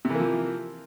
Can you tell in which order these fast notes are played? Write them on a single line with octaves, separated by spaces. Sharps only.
C3 E3 A#3 F3